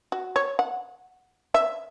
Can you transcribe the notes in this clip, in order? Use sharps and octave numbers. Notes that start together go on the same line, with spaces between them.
F#4
C#5
F#5
E5